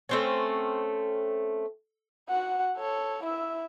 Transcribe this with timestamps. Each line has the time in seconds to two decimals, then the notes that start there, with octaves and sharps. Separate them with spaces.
0.09 A3 C4 C#4
2.29 F#4 F#5
2.77 A4 C#5
3.24 E4 E5